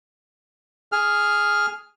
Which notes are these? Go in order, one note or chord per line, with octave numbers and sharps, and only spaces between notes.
G#4 F6